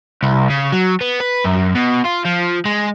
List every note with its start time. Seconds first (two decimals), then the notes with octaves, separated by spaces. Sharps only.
0.23 C2
0.50 C#3
0.72 F#3
1.01 B3
1.20 B4
1.44 F#2
1.75 B2
2.04 F4
2.25 F3
2.65 G#3